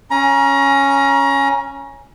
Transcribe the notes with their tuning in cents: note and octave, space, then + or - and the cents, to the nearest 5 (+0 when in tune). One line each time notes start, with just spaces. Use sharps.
C#4 +0 A#5 +30